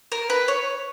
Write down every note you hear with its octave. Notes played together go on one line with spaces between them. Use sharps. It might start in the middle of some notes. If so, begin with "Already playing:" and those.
A#4
B4
C#5